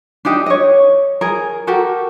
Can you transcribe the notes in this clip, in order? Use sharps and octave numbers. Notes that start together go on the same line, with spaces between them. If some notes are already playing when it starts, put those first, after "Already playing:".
D4 D#4 G4 D#5
C#5 D#5
G#4 A#4
F#4 G4 A4 A#4